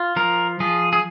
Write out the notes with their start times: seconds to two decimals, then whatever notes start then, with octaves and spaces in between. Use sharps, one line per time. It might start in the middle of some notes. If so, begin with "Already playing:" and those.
Already playing: F4
0.16 F3 A#4
0.60 F3 G#4
0.93 G#4